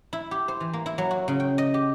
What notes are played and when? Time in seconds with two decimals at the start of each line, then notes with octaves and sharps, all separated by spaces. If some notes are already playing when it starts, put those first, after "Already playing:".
0.13 E4
0.31 G4
0.48 C5
0.60 E3
0.73 A#3
0.86 E4
0.98 F#3
1.11 F#4
1.28 C#3
1.40 G5
1.58 D#5
1.74 G4